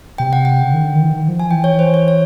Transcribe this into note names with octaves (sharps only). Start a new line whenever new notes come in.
C3 G5
F#5
G5
C#3
D#3
D3
D#3
E3
D#3
F3
G#5
E3 G5
C#5
C5
C#5
C#5